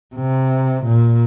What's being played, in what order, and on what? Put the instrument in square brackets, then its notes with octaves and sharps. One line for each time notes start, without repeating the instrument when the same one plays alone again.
[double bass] C3
A#2